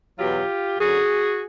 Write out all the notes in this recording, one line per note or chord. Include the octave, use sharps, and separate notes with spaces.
E2 B2 F#3 F4 G4
F#2 D3 F#3 F#4 G#4